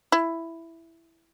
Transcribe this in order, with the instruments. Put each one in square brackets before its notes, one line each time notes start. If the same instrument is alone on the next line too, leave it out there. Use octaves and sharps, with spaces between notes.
[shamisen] E4